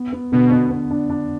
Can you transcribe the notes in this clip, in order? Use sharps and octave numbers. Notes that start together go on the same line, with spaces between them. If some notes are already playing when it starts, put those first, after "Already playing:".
Already playing: B3
B3
B2 D3
B3
B3
D4
D4